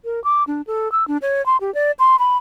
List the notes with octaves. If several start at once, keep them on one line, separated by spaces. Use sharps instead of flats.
A#4
D6
D4
A4
E6
D4
C#5
C6
G4
D5
C6
B5